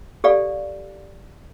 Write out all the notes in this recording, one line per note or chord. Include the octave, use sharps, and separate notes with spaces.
G4 A4 D5 F5